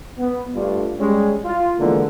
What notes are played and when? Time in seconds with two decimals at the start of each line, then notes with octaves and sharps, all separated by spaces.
0.18 B3
0.55 G2 A3 D4 F4
1.00 G3 G#3 C#4
1.45 F4
1.79 D3 E3 F3 G#3 A#3 B3